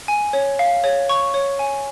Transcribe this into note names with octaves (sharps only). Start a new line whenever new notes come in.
G#5
C#5
F5
C#5
C#6
C#5
G#5